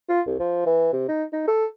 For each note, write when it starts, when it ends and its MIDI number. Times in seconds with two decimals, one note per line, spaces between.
0.09 0.21 65
0.27 0.39 36
0.39 0.66 53
0.66 0.92 52
0.93 1.07 48
1.09 1.24 63
1.33 1.45 63
1.47 1.66 69